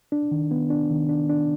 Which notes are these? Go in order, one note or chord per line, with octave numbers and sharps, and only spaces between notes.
D4
D#3
B3
D4
D#3
D4
D4